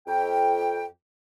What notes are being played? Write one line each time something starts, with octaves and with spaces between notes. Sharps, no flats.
F2 G5